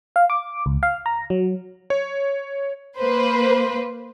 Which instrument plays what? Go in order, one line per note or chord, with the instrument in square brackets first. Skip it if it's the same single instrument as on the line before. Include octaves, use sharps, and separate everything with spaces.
[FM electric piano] F5
D6
C#2
F5
A#5
F#3
[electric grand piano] C#5
[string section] A#3 B4 C5